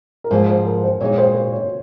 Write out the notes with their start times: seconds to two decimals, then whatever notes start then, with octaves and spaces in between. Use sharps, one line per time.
0.24 A#4
0.31 G#2 F3 A#3 C5
0.49 C5
0.66 A#4
0.84 C5
1.00 A#2 G#3 D#4 C#5
1.18 C5
1.35 C5
1.53 C#5